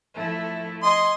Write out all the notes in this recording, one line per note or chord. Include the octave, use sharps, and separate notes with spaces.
F3 A3 E4
D#5 G#5 C6